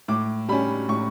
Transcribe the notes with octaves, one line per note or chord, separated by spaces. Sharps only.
A2 D6
G3 C#4 B5
A2 C#6